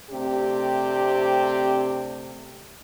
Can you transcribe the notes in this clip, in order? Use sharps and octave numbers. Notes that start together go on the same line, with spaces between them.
C3 A3 C4 D4 G4